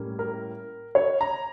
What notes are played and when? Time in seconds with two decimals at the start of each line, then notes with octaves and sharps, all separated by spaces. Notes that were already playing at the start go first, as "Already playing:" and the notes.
Already playing: A2 G3 A#3 C#4
0.19 A#4
0.95 C#5
1.21 A#5